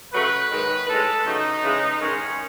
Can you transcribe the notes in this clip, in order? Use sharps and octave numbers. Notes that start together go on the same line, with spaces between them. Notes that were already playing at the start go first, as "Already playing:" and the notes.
C#3 F#3 A3 B4
G#2 D#3 G#3
A2 G#3 A4
C#3 F#3 A3 D#4
C#3 E3 G#3
G#2 D#3 G#3 C#4